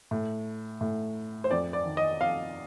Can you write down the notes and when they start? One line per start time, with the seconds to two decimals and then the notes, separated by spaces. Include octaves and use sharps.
0.11 A2
0.81 A2
1.44 C5
1.51 F2 D5
1.73 D5
1.85 D#3
1.97 D#5
2.21 F2 F5